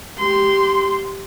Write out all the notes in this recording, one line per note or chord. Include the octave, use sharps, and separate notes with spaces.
G4 C6